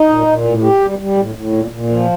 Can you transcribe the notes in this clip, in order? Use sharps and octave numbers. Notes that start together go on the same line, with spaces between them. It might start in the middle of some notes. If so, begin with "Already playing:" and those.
Already playing: D#4
A#2
A#2
A2
G4
G3
G3
A2
A2
A#2
A#2
F3